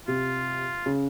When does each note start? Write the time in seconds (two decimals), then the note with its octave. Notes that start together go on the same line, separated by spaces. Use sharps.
0.08 C3 F4
0.86 C#3